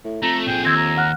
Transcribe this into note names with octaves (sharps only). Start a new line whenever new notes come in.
A2
F2 A3 A#5
A#2 G#4 G5
D#2 C4 E6 G#6 A#6
A#5
F#5 F6 F#6